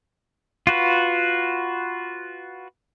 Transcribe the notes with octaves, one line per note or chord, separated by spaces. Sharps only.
F4 F#4 B4